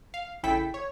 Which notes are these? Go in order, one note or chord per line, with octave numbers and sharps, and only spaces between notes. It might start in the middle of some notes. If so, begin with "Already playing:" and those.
F5
A1 C#3 E4 A4 G5 B6
C#5